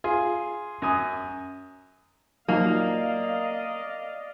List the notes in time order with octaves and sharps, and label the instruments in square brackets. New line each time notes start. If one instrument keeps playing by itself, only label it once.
[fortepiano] F4 G#4
F#2 G#5 D#6
[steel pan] F3 F#3 D#4 [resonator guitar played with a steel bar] A#3 [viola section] D5 D#5 F5